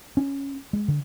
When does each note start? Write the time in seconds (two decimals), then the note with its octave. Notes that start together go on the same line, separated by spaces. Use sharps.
0.17 C#4
0.73 G#3
0.88 D3